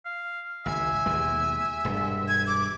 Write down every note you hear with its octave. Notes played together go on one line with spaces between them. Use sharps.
F5
G#1 C#2 E5 G#5
D#2 B2 G#3
E1 G2 G#3
G#6
D6